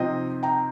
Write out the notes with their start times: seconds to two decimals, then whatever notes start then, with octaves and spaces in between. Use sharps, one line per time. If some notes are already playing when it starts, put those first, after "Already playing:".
Already playing: C3 F3 C4 D#4 D#5 G5
0.43 G5 A#5